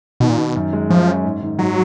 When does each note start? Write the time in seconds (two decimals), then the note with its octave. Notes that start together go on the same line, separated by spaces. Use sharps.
0.20 B2 D#3
0.30 A#2
0.38 B2 D#3
0.56 F#2
0.73 G#3
0.90 F#2 F3
1.07 C#4
1.24 G#2
1.41 D#3
1.59 G#2 F#3